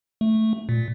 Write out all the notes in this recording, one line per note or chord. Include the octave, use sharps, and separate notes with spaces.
A3
A#2